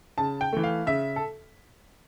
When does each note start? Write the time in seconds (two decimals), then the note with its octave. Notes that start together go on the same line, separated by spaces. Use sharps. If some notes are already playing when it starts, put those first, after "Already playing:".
0.18 C#3 A5
0.41 G5
0.53 E3 A3
0.64 F5
0.87 C#3 E5
1.16 A4